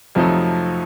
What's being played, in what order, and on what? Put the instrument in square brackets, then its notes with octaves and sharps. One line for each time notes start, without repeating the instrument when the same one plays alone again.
[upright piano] F2 C3 F#3 A3 D#4 [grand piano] F3